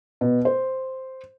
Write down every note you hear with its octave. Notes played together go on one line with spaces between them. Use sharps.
B2
C5